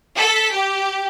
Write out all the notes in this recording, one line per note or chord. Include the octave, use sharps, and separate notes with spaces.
A4 B6
G4